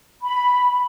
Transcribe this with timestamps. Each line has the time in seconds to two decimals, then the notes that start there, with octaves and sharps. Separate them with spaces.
0.22 B5